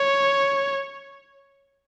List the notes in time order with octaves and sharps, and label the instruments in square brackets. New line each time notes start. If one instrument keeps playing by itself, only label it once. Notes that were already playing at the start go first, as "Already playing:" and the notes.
Already playing: [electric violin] C#5